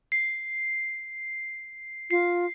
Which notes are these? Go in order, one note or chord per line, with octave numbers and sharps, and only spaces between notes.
C7
F4 C7